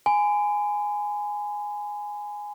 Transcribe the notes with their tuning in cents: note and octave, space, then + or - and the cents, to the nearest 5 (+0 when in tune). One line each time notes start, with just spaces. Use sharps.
G#5 +0 B5 +45